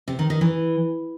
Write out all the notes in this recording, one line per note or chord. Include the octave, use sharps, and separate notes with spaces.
C3
D#3
D#3
E3